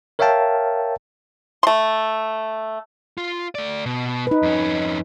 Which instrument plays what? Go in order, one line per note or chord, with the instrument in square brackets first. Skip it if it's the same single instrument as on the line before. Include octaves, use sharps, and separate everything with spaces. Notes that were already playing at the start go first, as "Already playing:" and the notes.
[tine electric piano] A#4 C#5 E5 F5 G5 A5
[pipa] A3 C6
[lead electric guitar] F4
A3 D5
B2
[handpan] D#4 B4
[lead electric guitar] F2 C#4